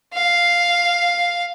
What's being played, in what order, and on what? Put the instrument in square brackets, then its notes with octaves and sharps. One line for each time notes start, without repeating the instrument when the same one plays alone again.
[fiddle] F5